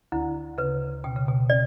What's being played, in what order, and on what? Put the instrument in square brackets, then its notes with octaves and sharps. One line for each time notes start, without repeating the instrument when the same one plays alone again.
[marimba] D2 D3 [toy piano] E4
[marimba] C#3 [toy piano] B4
[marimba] B2 [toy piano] G5
[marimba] C#3
B2
[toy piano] D5